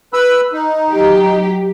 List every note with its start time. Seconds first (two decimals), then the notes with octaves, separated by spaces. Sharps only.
0.13 B4 B5 E6
0.53 D#4
0.90 F#3 G4